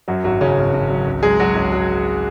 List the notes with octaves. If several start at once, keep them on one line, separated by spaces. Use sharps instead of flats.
F#2 F#3 F#4
G#1 F#3 F#4
G#1 C#3 C#4
G#1
G#1
F#3
C#2
F#3 G#3 G#4
F#3 F#4
C#2
F#3